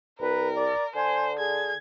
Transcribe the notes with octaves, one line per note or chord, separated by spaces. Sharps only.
C2 A#4 B4
D5
D3 C5 G#5
G#4 G#6